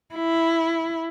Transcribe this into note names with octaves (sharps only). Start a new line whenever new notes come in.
E4